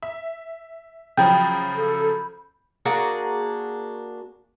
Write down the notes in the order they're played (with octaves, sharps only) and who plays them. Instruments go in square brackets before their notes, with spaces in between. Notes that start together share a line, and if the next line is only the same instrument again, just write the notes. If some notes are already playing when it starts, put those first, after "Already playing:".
[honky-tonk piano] E5
[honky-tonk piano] C#3 F3 F#3 [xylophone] G5 [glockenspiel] B5 G6
[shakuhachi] A4
[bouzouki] A#3 D4 F#4 G#4